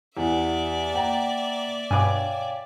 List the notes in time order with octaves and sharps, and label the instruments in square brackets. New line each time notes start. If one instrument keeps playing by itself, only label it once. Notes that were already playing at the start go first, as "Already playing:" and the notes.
[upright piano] E2 B4 F#5 [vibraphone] G4 [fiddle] D5 E5
[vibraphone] A#3 [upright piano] F#5 G5 A#5
[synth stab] G2 B2 [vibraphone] C#5 F5 G5 [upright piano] G#5 D6